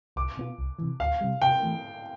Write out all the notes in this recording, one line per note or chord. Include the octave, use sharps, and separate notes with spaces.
C2 D6
B2 B3 F4
C2
C3 E3
D2 F5
C3 G3
C3 G5
E3 A3